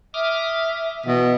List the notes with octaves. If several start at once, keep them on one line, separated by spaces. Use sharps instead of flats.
E5 D6 D#6 F6
B2 E3